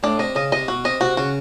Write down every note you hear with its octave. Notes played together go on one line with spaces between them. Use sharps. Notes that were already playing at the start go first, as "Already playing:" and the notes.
A2 D4
C3 D#5
C#3 D#5
C3 D#5
B2 F#4
C3 D#5
C3 F#4
C#3 F#4